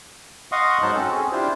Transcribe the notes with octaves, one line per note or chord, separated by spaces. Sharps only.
D#5 F5 F#5 C6 C#6 D#6
G#2 F#3 D#4 C5 A5 F#6
C4 C#4 F#4 A4
C4 C#4 G#4
D4 E4 F4 G4 C5